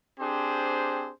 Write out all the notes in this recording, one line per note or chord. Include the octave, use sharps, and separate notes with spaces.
C4 D4 G4 G#4 C5